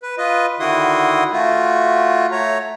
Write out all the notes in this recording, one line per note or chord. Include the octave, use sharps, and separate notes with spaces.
B4
F4 B4 D#5
D3 D#3 E4 F#4 C6 D#6
A3 F4 F#4
A3 C#5 A#5